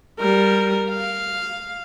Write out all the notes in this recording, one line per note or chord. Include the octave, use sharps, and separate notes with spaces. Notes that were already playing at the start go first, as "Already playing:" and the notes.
G3 A#4
F5